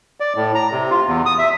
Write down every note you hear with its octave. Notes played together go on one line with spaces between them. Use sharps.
D5
A2
A#5
C3
F4
E2
D#6
E5